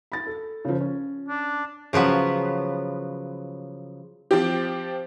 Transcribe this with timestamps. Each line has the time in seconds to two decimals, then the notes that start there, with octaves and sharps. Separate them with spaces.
0.12 B5 A6
0.27 A4
0.65 C#3 F3
0.81 C#4
1.29 D4
1.93 C#3 F3 F#3 B3
4.31 F3 C4 G4